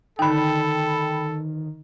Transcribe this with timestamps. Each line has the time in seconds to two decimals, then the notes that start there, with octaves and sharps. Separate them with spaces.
0.19 D3 D#3 D#4 A4 G5 B5